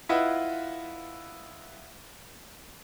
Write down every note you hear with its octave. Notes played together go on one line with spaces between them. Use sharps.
E4 F4 B4 D#5 E5 F#5